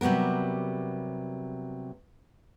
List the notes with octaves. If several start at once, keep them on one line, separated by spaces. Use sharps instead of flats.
C3 F#3 G3 B3 A#4